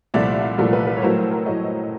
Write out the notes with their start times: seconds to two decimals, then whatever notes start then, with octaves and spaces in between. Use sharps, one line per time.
0.14 C2 A#2 F3 A3 D5 E5
0.58 C2 A#2 F3 A3 A#4
0.73 B4
0.87 B4
0.97 C#5
1.02 A2 F#3 A3 A#4 C5
1.17 A#4
1.31 A#4
1.46 A2 F#3 A3 C#5 D#5